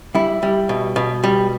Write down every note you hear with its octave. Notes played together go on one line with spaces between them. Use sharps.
G3 E4
G3
B2
B2
G3